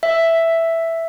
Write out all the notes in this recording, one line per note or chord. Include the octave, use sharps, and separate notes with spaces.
E5